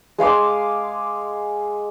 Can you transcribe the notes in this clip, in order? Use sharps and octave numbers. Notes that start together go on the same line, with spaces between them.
G#3 F5 C6 D6